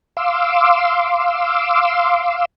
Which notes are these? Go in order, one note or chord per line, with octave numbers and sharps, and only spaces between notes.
F5 C6 D6 E6